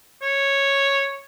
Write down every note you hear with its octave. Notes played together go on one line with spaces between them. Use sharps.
C#5